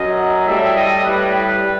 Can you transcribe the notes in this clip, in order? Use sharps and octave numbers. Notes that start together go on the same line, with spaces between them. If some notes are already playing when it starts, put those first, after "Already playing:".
Already playing: F#2 F#3 D#5
A2 G3 E5
D#5
A2 G3 B4